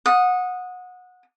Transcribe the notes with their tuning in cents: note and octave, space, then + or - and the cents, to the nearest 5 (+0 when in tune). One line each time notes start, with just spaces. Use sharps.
F#5 -25 D#6 +0